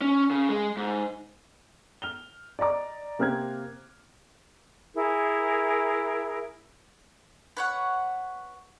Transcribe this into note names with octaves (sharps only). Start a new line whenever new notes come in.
C#4
C#3
G#3
G#2
F6 F7 G7
D5 D#5 A#5 D6
C3 A#3 C4 F6 F#6 G#6
E4 G#4 A#4
B4 C#5 F#5